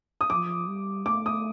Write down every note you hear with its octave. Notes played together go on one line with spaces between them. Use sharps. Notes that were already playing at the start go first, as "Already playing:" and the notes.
D#6
F3 D6
G3
A3 D6
D#6